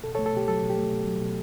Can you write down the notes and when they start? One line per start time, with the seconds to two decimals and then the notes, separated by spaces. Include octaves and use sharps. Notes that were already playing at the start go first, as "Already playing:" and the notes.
0.03 B2 A4
0.15 A3 A4 C#5
0.26 A4
0.32 B2 G4
0.48 F#3 A4
0.63 B2
0.70 G4
0.78 A3
0.92 B2
1.06 F#3
1.21 B2